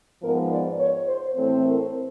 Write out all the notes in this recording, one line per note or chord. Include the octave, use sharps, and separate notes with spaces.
G#2 F3 G#3 B3 A#4
D5
C#5
C5
A2 E3 A3 C4
A#4